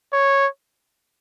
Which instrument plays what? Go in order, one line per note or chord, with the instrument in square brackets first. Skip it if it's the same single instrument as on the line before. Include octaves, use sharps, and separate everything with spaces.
[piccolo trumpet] C#5